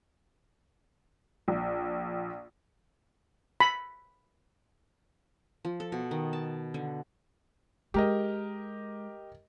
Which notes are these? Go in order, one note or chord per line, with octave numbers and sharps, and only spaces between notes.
A#1
B5
F3
A4
B2
D#3
A5
D3
G#3 G4 A#4 D#5